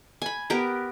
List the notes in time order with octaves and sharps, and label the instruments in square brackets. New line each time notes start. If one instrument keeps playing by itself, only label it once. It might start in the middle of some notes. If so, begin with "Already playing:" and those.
[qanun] G#5 B5
B3 G4 A#4